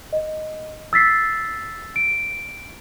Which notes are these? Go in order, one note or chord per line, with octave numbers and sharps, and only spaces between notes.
D#5
E6 A6 B6 C7
D7